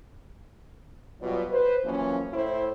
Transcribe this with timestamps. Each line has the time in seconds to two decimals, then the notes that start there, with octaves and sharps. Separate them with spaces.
1.21 B2 F#3 G3 F4 D5
1.50 B4 C5
1.84 F#2 E3 F3 A#3 C#4
2.33 A2 E4 C5